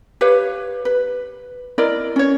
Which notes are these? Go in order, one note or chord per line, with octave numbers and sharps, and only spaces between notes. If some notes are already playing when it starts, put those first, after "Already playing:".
G4 B4 C#5 F5
B4
E4 A#4 D5 D#5
C#4 C#5